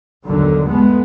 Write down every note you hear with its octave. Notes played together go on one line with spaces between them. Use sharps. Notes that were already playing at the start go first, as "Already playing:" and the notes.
G1 D#2 D3 D#3 F#3
G#3 A3 B3